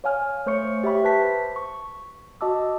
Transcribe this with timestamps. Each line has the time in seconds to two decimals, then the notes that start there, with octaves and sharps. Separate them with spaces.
0.04 C#5 F5 G#5 F6
0.46 A3 C5 C#5 C#6 C#7
0.84 G4 E5 B5 C#6
1.04 B4 C5 A5 B6
1.56 C#6
2.41 F#4 D#5 A5 D6 E6